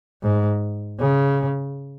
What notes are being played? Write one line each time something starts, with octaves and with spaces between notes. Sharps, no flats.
G#2
C#3